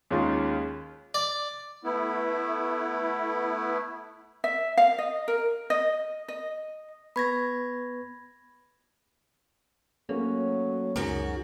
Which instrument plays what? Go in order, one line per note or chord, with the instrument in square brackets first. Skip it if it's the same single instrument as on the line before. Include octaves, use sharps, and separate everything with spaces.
[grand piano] D#2 G#3 C#4 D#4 F4 C6
[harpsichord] D5
[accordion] A3 B3 E4
[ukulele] E5
F5
D#5
A#4
D#5
D#5
[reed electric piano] B3 B4 C#6 [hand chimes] B5 G#6 A#6
[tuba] F#3 [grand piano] A3 C#4 F#4 [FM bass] A#3
[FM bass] C#2 [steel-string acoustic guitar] F#2 F#4 [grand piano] D#3 G#4